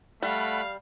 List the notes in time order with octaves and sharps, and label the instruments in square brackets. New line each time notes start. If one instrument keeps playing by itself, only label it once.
[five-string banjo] G3 [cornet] A3 [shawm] F5 [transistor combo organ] F#5 B5